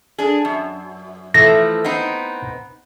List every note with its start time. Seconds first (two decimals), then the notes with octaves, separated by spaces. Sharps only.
0.18 D4 G#4
0.45 F#2
1.34 E3 F3 A3 A#6
1.84 B3 C4 D#4